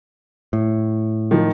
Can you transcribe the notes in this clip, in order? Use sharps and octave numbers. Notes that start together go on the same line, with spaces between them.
A2
D#3 F3